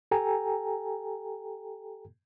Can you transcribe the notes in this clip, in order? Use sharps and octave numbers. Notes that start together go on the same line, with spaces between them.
G4 A4 G5 G#5 A#5